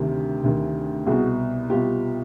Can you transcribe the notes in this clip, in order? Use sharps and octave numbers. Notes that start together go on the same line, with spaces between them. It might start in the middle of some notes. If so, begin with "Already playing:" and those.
Already playing: D2 C3 D#3
D2 C3 D#3
C2 B2 F#4 G#4
C2 B2 F4 G4